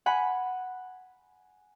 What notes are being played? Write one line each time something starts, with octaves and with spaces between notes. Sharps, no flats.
F#5 G#5 B5